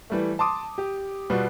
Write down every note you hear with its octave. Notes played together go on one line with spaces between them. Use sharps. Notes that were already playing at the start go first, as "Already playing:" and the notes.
E3 G3 A3
A5 C6 D6 D#6
G4
B2 G3 B3 F4 F#4